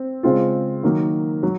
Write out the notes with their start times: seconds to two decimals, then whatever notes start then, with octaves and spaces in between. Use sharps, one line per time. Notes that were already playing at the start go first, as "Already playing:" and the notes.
Already playing: C4
0.23 C#3 G#3 C4 F4
0.83 D#3 F#3 A#3
1.43 F#3